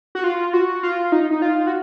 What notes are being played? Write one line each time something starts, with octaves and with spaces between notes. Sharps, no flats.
F#4
F4
F#4
F4
D#4
D#4
F4
F#4